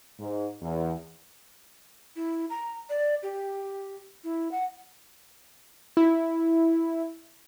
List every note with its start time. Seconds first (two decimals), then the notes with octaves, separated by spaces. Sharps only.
0.20 G#2
0.62 E2
2.16 E4
2.50 A#5
2.89 D5
3.23 G4
4.24 E4
4.51 F#5
5.97 E4